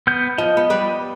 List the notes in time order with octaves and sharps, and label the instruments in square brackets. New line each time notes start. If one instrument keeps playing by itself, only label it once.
[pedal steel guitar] B3 G6
[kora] F3 [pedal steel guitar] D#5
[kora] B3
G3 B4 D5